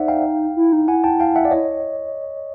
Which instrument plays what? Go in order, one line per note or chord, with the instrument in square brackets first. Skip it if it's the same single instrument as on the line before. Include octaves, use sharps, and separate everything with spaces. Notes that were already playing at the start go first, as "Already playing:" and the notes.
Already playing: [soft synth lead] D#4 [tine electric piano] C5 D5 E5 F#5
[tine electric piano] F5 G5
[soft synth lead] E4
D#4
[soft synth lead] E4 [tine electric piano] F#5 G#5
[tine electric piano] G5 A5
F5 G5
E5 F#5
D5
[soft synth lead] E4 [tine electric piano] C#5 D#5